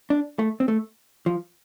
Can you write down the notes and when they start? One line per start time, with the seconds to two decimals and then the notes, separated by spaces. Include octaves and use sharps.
0.10 D4
0.39 A3
0.60 C4
0.68 A3
1.26 F3